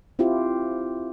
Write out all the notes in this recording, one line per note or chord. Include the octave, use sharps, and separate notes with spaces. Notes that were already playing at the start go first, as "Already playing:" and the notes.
C4 E4 F4 G4